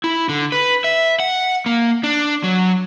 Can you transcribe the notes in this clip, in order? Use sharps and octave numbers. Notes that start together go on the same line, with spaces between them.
E4
D3
B4
E5
F#5
A#3
D4
F#3